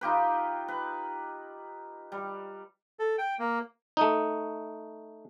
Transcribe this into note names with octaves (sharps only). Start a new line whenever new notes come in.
D#4 F4 G4 B4
B4
G3
A4
G5
A#3
A3 D#4